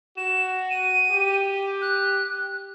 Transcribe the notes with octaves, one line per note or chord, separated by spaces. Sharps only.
F#4 E7
D#7
G4
F#6